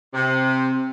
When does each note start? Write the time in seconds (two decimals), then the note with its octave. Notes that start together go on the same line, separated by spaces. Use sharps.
0.14 C3